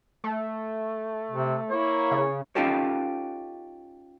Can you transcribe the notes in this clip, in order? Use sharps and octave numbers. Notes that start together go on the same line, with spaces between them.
A3
C3
A#3 E4 C#5
C#3
C#4 D#4 F4 G4 A4 C#5